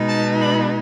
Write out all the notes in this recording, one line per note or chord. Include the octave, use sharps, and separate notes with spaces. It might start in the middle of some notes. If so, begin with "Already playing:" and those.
Already playing: B2 G#3 B3 D#4
A5
B5